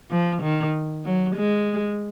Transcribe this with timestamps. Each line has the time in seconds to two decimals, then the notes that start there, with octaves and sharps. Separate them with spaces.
0.11 F3
0.42 D#3
1.05 F#3
1.36 G#3